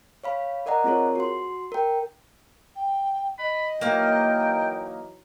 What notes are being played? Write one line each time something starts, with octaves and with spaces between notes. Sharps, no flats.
C#5 F5 B5
A#4 D5 D#5 F#5 A#5
C4 F4 G#4 A#4 C#5
F#4 C6
A#4 G5
G5
D#5 B5
E3 F#3 A#3 D#4 F5 G5